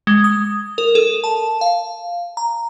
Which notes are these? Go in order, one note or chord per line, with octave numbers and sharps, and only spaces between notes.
G#3
D#6
A#4
A4
A5
F5
A#5